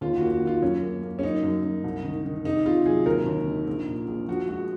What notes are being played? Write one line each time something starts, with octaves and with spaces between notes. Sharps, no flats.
D#2 F4
F#4
A#3
F#4
D#3
F4
F#2 C#4
A#3
A#3
C#4
F#2 D#4
F#2
F#2
C2
D#3
D#3
C3 D#4
C3 F4
F#3 G#4
D#2 A#4
D#2
D#3
A#1
A#2
A#1
F3 F#4
G#3 F#4